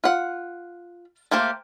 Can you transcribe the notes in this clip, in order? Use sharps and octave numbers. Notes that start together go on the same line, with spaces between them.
F4 F#5
A3 A#3 G4 C5